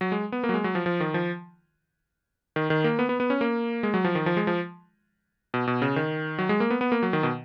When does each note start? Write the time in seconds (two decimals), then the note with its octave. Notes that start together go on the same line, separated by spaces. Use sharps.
0.01 F#3
0.12 G#3
0.32 B3
0.44 A#3
0.49 F#3
0.54 G#3
0.64 F#3
0.75 F3
0.86 F3
1.00 D#3
1.14 F3
2.56 D#3
2.70 D#3
2.84 A#3
2.99 B3
3.09 B3
3.20 B3
3.30 C#4
3.41 A#3
3.83 G#3
3.94 F#3
4.04 F3
4.15 D#3
4.26 F3
4.37 G#3
4.47 F3
5.54 B2
5.67 B2
5.82 C#3
5.96 D#3
6.38 F#3
6.49 G#3
6.60 A#3
6.70 B3
6.81 B3
6.92 A#3
7.03 F#3
7.13 D#3
7.23 B2